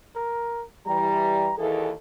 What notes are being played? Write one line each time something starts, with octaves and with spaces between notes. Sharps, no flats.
A#4
E3 G3 A#5
D#2 E3 G#4 A4